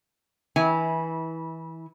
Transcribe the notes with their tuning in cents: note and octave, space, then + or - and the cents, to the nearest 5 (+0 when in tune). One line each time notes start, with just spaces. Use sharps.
E3 -20 E4 -30 G#5 +0